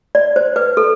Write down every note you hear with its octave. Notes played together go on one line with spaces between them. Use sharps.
D5
C5
B4
A4